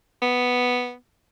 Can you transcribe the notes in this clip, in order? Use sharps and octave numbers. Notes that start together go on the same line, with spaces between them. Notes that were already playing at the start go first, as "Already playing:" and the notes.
B3